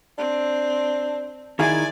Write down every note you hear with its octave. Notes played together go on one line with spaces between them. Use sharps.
C4 D4
D#3 E4 G#4 D5 G#5